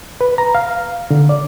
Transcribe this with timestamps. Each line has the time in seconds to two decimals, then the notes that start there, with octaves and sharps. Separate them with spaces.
0.21 B4
0.38 A#5
0.55 F5
1.11 D3
1.29 D5